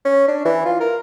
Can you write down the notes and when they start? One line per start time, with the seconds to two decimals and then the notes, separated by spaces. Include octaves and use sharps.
0.05 C#4
0.28 D4
0.45 E3
0.65 F4
0.80 A#4